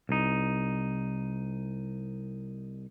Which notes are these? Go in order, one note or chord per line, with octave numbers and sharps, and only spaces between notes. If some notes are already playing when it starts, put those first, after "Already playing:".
C2 D#4